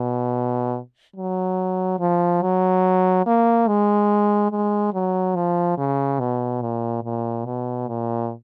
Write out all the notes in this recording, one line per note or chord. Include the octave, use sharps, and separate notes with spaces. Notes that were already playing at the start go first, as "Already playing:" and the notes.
Already playing: B2
F#3
F3
F#3
A#3
G#3
G#3
F#3
F3
C#3
B2
A#2
A#2
B2
A#2